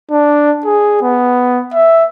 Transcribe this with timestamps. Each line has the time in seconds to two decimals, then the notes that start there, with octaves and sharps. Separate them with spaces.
0.11 D4
0.65 G#4
1.02 B3
1.74 E5